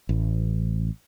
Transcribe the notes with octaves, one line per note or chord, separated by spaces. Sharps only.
A1